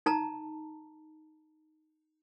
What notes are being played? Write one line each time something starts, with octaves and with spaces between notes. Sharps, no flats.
D#4 A5 A#5